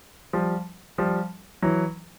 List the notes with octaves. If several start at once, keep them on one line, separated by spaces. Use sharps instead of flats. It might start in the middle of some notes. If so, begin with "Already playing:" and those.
F3 G3
F3 G3
E3 F#3